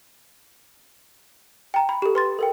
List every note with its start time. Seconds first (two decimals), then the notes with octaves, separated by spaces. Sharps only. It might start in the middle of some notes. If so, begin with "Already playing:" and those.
1.74 G5 A#5
1.89 B5
2.02 G4 A4
2.15 B4 C6 A6
2.39 A4 A#4 G5